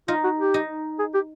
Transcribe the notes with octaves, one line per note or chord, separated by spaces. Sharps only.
D#4 F4
F#4
G4
D#4
G#4
G4